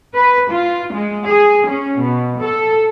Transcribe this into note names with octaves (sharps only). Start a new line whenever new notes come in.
B4
F4
G#3
G#4
C#4
B2
A4